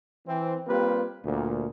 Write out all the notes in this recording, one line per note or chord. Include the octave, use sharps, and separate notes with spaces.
E3 C4
G3 A#3 C4 F4 G4 B4
D2 A#2